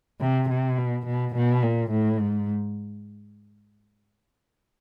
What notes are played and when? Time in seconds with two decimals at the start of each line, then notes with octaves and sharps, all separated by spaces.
0.21 C3
0.49 C3
0.78 B2
1.06 B2
1.35 B2
1.63 A#2
1.91 A2
2.20 G#2